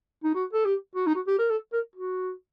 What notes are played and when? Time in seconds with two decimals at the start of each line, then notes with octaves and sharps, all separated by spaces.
0.24 D#4
0.35 F#4
0.53 A4
0.65 G4
0.95 F#4
1.06 D#4
1.15 F#4
1.27 G4
1.39 A#4
1.50 A4
1.73 A#4
1.96 F#4